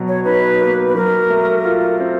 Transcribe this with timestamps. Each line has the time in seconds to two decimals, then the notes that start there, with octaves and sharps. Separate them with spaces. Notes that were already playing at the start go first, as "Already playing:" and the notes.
Already playing: B2 F#3
0.08 C#5
0.25 D#4 B4
0.61 A#3
0.88 B4
0.95 F#3 A#4
1.30 A3
1.65 F4
2.00 C4